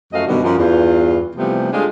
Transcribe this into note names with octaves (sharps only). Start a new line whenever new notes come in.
F#2 F3 A3 F#4 D#5 F5
F#2 B2 D3 D#3 F#3 G3
F#2 F3 F4
E2 G2 F4
C3 E3 F3 G3 A3 B3
G#3 A3 D4 F4 G4 G#4